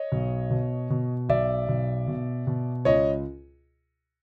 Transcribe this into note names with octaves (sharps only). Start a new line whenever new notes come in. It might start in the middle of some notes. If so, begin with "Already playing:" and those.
Already playing: C#5 D#5
B1
B2
B2
B1 D5 E5
B1
B2
B2
C#2 C#5 D#5